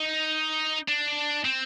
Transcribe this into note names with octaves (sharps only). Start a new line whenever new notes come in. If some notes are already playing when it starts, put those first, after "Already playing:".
Already playing: D#4
D4
C4